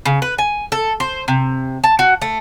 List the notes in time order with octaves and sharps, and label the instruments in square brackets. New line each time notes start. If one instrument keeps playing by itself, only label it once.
[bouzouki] C#3
B4
G#5
A4
C5
C3
A5
F#4
A3